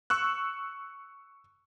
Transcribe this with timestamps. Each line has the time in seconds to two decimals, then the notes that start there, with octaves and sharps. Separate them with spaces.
0.10 C#6 E6 F#6